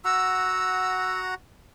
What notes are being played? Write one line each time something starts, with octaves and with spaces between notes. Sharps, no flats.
F#4 F#5 A#5 E6